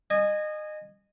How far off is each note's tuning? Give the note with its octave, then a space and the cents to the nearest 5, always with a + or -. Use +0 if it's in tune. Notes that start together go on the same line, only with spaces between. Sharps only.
D#5 -25 G#5 +0